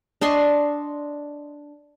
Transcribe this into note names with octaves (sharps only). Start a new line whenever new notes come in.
D4 D#5 C6 C#6